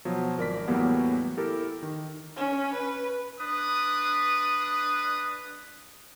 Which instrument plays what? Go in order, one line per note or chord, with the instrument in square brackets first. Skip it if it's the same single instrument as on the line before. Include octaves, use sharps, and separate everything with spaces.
[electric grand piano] B2 F3 F#3
G#1 A#4 D5 B6
E2 A2 F#3 G3 A#3 B3
E4 G4 A4 A#4
D#3
[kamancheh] C#4
B4
[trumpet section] D4 B4 D#6